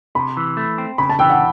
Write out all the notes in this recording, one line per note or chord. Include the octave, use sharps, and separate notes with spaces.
C3 B5
E3
A3
C4
C#3 B5
A5
E3 G5
F#5